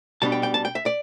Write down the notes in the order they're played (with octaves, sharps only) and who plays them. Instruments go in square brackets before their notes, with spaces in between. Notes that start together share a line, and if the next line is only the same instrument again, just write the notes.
[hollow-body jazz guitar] B2 G3 B3 D4 A5
G5
G5
A5
G5
E5
D5